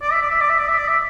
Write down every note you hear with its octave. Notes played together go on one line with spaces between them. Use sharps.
D5
E5
D5
E5
D5
E5
D5
E5
D5
E5